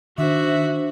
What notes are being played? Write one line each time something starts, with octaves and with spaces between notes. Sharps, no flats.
D#3 D4 F#4 C5 E5